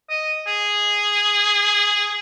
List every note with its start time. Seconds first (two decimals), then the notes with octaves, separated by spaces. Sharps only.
0.10 D#5
0.47 G#4